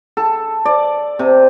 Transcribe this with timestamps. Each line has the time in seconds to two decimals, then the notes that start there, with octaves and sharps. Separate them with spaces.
0.17 A4
0.66 D5
1.19 C3